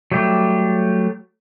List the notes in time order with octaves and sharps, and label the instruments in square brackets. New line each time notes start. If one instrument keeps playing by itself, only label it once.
[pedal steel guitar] F#3 G3 A3 G4